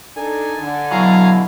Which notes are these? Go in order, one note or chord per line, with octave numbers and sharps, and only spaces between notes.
D4 D#4 A4 G#5
D3
B2 F#3 E4 F5 G#5 A#5 C7